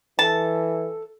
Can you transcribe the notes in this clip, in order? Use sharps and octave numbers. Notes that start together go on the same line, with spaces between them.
E3 A4 A5